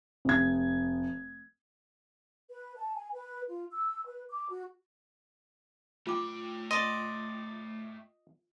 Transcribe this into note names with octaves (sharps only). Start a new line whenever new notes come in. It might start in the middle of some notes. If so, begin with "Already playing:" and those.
F1 G#6
B4
A5
G#5
B4
F4
E6
B4
D6
F#4
A3 F4 G5 D6
D5 D#5 C6